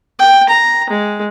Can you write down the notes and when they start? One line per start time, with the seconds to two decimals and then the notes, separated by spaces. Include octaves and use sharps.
0.19 G5
0.49 A#5
0.90 G#3